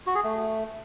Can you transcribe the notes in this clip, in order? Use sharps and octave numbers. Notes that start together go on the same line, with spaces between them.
F#4
G#4
A3